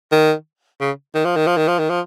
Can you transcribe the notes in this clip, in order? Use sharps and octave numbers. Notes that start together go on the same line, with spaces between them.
D#3
C#3
D#3
F3
D#3
F3
D#3
F3
D#3
F3